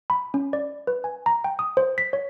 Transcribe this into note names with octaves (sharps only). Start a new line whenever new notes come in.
B5
C#4
D5
B4
G#5
A#5
G5
D#6
C5
B6
C#5